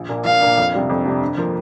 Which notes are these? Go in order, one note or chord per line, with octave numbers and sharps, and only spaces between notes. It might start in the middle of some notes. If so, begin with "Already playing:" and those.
Already playing: A#1
A#2 A#3 D4
A#1 F5
A#2 A#3 D4
F2
C3 G3 D4
F2
C3 G3 D4
G2
F3 A#3